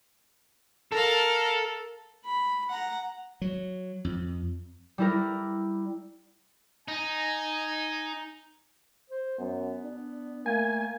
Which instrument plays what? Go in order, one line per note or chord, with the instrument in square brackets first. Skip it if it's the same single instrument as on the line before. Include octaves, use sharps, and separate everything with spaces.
[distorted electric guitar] A4 [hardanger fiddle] A#4 F5
[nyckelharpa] B5
F#5 A#5
[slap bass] F#3
F2
[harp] G3 E4 A#4
[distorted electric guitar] D#4 [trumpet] G#5
[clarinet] C5
[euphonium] F#2 [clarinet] B3
[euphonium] D4
[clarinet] A3 [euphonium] A#3 [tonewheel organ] G#5